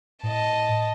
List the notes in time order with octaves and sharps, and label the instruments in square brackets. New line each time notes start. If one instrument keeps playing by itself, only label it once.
[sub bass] A2 [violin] D#5 A5